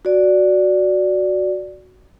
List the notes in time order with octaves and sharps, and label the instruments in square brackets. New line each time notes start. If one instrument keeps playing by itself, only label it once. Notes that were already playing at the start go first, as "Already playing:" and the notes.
[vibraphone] F#4 D5